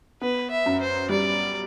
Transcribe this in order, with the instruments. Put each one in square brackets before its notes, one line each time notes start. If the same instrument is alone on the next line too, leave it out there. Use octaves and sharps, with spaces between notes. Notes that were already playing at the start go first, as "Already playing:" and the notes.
[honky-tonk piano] B3 [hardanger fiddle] B4
[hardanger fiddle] E5
[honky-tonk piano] F#2
[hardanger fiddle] C5
[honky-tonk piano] G3 [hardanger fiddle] D5